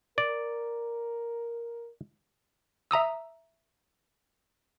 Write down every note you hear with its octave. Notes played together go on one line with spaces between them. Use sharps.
A#4 D5
E5 A#5 D#6 E6